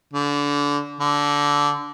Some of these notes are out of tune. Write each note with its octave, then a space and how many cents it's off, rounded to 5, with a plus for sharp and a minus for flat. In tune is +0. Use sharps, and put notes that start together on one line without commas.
D3 -30
D3 -15